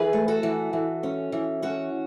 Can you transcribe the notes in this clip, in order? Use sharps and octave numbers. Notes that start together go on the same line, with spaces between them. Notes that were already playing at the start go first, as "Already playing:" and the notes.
Already playing: E3 G#4 B4
A3
F#4 A4
E3
E3
C#4
E3
C#4 F#4